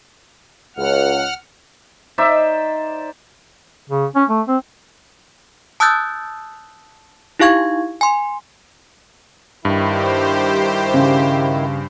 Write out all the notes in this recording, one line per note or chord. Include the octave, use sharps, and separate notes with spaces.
C#2 F#5 F6
D#4 C5 D5 E5
C#3
C#4
A3
C4
A5 D#6 E6 F#6 G6 A6
D#4 E4 G4 F5 C#6 G#6
G#5 C6
G2 D#3 E4 G4 C5
C#3